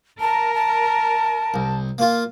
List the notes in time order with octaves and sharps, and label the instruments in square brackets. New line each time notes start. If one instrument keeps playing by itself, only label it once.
[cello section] A#4 [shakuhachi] A5
[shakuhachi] A5
[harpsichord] C2
A#3 F4